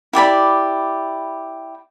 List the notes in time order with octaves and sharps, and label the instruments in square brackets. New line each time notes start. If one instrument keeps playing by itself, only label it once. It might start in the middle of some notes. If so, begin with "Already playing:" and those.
[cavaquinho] E4 G4 D5 B5